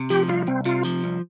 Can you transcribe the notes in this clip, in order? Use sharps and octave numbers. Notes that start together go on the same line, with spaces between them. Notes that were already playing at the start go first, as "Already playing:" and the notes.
Already playing: C3
F3 G4
C2 F4
C2 C4
C3 F4
F3
C2